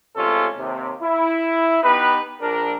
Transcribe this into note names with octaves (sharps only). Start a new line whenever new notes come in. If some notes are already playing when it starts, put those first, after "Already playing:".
A1 C3 G#3 C#4 F4 A4
D#2 C3
E4
B3 D#4 G4 B4
A#1 D4 A#4